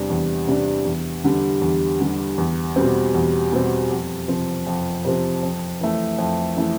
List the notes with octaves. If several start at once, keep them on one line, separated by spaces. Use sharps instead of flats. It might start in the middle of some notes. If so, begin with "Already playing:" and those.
Already playing: E2 C3 G3 D4
E2
C3 G3 D4
E2
D3 G3
E2
D3 G3
E2
B2 G3 C4
E2
B2 G3 C4
F2
C3 F3 C4
F2
C3 F3 C4
F2
E3 A3
F2
E3 A3